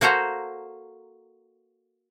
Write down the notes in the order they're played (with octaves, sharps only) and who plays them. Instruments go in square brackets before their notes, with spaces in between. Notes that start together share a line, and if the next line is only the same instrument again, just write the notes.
[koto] A#3 F#4 A4 C5 A#5